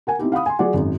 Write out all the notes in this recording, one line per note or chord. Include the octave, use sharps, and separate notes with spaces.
A#4 F#5 G#5
C4 D#4 E4 G4
F5 F#5 B5 D#6
G#5 C6
F#3 F4 G#4 D5 F#5
G#1 F#2